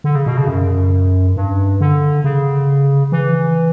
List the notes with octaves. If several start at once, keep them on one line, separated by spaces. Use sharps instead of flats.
D3
C#3
B2
C#3
F#2
G2
D3
C#3
E3